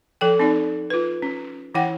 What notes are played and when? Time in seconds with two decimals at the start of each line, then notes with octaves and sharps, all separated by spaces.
0.21 F3 A4 G5
0.39 C4 D#4 D5
0.90 F4 B4
1.22 C#4
1.74 E3 E4 F#5 G5